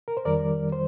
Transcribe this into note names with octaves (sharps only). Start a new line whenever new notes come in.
A#4
C5
F2 D#3 G3 A#4 D5
C5